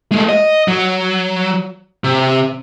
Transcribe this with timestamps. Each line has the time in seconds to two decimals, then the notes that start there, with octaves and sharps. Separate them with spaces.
0.12 G#3 A3
0.29 D#5
0.68 F#3
2.04 C3